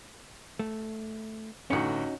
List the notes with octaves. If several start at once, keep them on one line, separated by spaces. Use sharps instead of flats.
A3
G1 A2 C#4 D#4 F#4 C#7